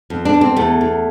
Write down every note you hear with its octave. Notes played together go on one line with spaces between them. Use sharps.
F2
D4
F2
C4
E2 A3
E2